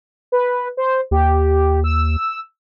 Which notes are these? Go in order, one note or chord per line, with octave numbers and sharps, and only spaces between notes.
B4
C5
D#2 G4
E6